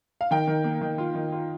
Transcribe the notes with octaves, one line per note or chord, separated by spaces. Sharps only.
F5
D#3 G5
D#3
A#3
D#3
F4
D#3
F4